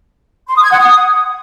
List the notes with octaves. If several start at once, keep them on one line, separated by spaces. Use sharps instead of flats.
C6
D#6
G#6
F#5
D#6